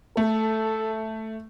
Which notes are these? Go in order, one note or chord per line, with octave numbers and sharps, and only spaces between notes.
A3 A4